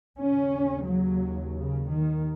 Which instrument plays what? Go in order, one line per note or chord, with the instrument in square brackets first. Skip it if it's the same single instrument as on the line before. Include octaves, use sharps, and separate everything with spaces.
[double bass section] D#2 C#3 C#4
F#3
C#3
D#3